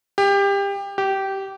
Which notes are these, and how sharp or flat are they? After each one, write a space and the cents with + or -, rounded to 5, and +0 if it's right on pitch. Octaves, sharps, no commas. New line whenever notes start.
G4 +25
G4 -15